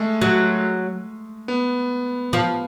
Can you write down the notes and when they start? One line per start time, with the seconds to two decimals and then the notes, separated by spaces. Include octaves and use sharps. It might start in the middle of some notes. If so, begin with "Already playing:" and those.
Already playing: G#3 A3
0.22 F#3
1.48 B3
2.33 F3